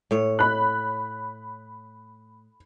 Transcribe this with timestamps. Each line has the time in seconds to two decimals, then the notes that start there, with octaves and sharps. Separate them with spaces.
0.11 A2 C#5
0.39 B5 F#6